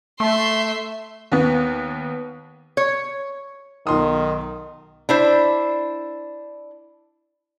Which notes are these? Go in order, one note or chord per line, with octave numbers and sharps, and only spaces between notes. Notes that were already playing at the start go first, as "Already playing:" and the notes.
A3 E5 C6
D#2 B3
C#5
B1 D#3 C6 D#6
D4 E4 C5